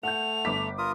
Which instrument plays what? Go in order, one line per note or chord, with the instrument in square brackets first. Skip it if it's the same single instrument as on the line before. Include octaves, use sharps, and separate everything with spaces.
[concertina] A3 [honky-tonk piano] F#5 G6 [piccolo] F7
[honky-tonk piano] G1 D6 B6
[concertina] F4 A#4 D#6